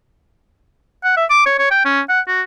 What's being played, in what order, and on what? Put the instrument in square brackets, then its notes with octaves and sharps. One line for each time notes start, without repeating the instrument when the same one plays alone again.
[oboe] F#5
E5
D6
C#5
C#5
G5
C#4
F#5
F#4